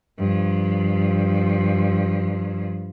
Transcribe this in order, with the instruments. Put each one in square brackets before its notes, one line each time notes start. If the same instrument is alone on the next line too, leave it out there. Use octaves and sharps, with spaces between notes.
[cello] G2 F3